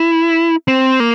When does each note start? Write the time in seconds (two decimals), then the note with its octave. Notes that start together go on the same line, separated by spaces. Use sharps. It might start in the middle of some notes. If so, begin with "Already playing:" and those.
Already playing: E4
0.68 C4
1.00 A#3